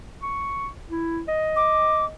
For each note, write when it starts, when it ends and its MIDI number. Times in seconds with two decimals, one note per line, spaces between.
0.22 0.68 85
0.89 1.21 64
1.28 2.13 75
1.56 2.05 86